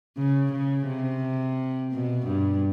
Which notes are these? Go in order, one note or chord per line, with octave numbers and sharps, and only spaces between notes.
C#3
C#3
C3
B2
G2